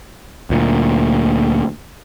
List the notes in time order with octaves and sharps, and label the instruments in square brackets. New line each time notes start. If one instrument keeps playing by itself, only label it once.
[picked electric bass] D2 A#2